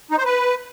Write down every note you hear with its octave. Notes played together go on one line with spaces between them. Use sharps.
D#4
C5
B4